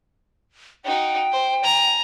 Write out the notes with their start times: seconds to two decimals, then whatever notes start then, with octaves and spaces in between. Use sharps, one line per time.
0.85 D#4 F#4 G5
1.32 C5
1.63 G#5 A#5